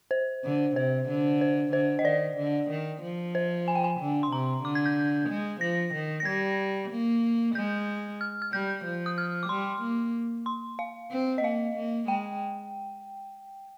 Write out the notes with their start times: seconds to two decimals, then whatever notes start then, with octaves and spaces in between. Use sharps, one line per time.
0.11 C5
0.44 D3
0.76 C3 C5
1.09 D3
1.41 C5
1.72 D3 C5
1.99 D#5
2.05 D#3 D5
2.37 D3
2.70 D#3
3.02 F3
3.35 C5
3.68 G#5
3.75 G5
3.84 G#5
4.00 D3
4.23 C6
4.31 C3 A#5
4.64 D3 D6
4.75 G#6
4.86 G6
5.29 G#3
5.61 F3 A#6
5.94 D#3
6.20 A#6
6.25 G3 G#6
6.91 A#3
7.55 G#3 G6
8.21 F6
8.42 F6
8.53 G3 G6
8.85 F3
9.06 D#6
9.18 F6
9.43 D6
9.49 G3 C6
9.82 A#3
10.46 C6
10.79 F5
11.11 C4
11.38 D#5
11.44 A#3 F5
11.76 A#3
12.08 G#3 G5